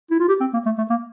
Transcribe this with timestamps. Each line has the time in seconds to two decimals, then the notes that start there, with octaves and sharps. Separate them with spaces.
0.11 E4
0.20 F4
0.28 G4
0.40 C4
0.54 A#3
0.66 A3
0.78 A3
0.90 A#3